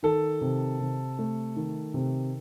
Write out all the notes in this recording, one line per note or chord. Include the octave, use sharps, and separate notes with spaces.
D#3 A4
C3
C3
A3
D#3
C3